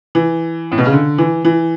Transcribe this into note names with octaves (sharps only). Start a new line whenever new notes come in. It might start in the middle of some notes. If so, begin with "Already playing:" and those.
E3
A2
B2
C#3
D3
E3
E3